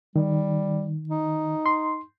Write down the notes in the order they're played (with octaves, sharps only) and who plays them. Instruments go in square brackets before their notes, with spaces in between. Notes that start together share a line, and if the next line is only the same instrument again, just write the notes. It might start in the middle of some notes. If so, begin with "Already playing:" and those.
[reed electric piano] D#3 [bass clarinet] G3
[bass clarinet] D#4
[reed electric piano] C6